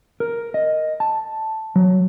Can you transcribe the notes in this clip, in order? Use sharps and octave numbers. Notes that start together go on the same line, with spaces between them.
A#4
D#5
A5
F#3